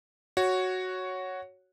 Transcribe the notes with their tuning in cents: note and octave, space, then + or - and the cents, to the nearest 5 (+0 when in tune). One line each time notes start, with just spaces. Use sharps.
F#4 +0 C#5 +0